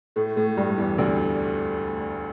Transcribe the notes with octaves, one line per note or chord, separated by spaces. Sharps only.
A2 A3
A2 A3
G2 G3
E2 E3
D2 D3